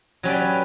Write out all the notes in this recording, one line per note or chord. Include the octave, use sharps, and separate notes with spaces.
F#3 C#4 G4 B4 D5